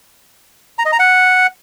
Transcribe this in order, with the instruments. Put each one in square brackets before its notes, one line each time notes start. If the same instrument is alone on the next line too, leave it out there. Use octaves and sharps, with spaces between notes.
[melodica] A#5
D#5
A#5
F#5